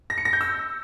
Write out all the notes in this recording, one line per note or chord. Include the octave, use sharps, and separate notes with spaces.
A#6
C#7
A#6
G6
E6